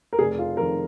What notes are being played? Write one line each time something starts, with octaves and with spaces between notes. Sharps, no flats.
A#4
F1 G#4
F4
F2 D#3 A#4